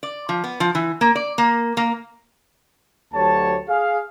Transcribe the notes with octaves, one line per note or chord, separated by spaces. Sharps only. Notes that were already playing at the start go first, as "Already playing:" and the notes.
D5
F3
B3
F3
E3
A#3
D5
A#3
A#3
D2 F#3 A3 G4 C#5 A5
G#4 F5